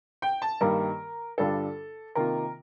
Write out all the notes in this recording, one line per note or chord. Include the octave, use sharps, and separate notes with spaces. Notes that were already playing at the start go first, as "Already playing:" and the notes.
G5
A5
G2 D#3 G3 A#3 A#4
G2 D3 G3 D4 F4 A4
C3 D#3 A#3 F4 A#4